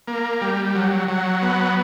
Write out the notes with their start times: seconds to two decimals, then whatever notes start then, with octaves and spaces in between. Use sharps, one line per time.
0.07 A#3
0.42 G3
0.75 F#3
1.08 F#3
1.42 B3